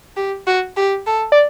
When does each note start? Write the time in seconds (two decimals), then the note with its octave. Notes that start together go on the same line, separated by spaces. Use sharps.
0.17 G4
0.47 F#4
0.77 G4
1.07 A4
1.32 D5